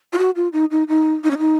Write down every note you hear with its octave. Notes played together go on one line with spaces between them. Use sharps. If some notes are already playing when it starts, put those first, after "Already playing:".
F4
F#4
F4
D#4
D#4
D#4
D#4
C#4
D#4